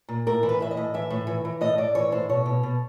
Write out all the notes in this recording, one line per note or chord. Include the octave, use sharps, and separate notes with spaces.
A#2
A2 A#4
E3
B4
A2 E5
D#5
A2
E3 E5
A2
E3
E3
A2 D#5
A2 D5
E3 C#5
A2 C5
B2 C#5
B2
B2